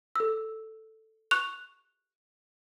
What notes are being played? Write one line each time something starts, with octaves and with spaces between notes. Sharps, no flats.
A4 E6
C#6 F#6 F7